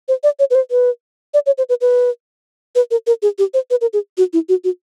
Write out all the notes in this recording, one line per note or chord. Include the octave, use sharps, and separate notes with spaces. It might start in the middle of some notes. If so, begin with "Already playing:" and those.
C5
D5
C#5
B4
C5
B4
D5
C#5
C5
B4
B4
B4
A#4
A#4
G#4
G4
C5
B4
A#4
G#4
F#4
E4
F#4
F#4